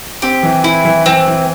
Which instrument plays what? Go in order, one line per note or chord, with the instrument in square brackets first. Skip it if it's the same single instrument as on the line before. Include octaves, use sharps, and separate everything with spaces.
[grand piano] C4 [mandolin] G4
[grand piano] E3
[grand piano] E3 [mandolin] E4
[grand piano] E3
[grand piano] E3 [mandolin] C4
[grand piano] E3